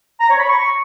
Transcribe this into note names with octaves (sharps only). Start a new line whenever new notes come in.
A#5
C#5
B5
C#6